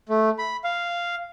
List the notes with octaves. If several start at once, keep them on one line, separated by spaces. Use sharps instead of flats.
A3
B5
F5